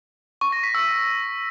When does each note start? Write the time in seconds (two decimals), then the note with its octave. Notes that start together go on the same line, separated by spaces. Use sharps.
0.41 C#6
0.52 A#6
0.63 B6
0.75 E6